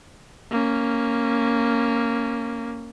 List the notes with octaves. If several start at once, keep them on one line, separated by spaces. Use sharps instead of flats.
A#3 C#4